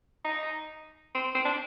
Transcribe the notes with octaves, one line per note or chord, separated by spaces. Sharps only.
D#4
C4
C4
D4